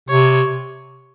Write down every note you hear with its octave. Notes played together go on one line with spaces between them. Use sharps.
C3 C#5